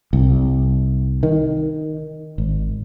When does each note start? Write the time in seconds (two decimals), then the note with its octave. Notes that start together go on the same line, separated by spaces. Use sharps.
0.13 C2
1.23 D#3
2.38 G#1